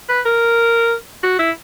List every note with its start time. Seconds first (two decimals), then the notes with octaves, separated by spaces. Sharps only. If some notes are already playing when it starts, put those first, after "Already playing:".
0.09 B4
0.25 A#4
1.23 F#4
1.39 E4